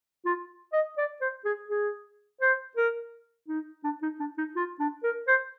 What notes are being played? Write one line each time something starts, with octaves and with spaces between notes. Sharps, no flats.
F4
D#5
D5
C5
G#4
G#4
C5
A#4
D#4
D4
D#4
D4
D#4
F4
D4
A#4
C5